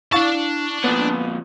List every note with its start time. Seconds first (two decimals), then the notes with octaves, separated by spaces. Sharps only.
0.12 D4 E4 F5 A5 C#6
0.84 F2 A#2 B3